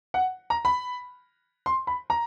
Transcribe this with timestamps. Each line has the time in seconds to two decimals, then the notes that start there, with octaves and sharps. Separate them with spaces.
0.14 F#5
0.50 A#5
0.65 B5
1.66 C6
1.87 B5
2.10 A#5